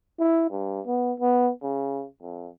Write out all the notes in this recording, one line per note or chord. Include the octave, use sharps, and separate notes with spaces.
E4
G2
B3
B3
C#3
F2